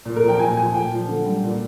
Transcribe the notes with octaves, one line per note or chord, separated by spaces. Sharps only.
A#2
A#4
F3
G5
A#2 G#5
F3 G#5
A#2 G5
F3
D3
G3
A#2